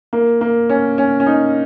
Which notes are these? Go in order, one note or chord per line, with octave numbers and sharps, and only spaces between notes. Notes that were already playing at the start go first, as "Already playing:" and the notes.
A#3
A#3
C#4
C#4
C#4
D#4